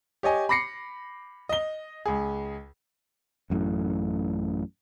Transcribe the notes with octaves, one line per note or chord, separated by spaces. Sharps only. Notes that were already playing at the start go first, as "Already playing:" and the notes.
G4 C#5 D#5 G#5
B5 D6 A#6 C7 C#7
D#5 G7
C#2 G#4
A1 F#2 A2